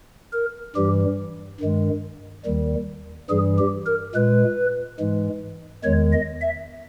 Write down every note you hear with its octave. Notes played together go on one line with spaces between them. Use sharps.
A#4
G2 E3 G3 G4
G2 D#3 G#3
D#2 D#3 G3
G2 E3 G3 G#4
G4
A#4
A#2 G#3 B4
G#2 E3 G#3
E2 D#3 G#3 C#5
D#5
E5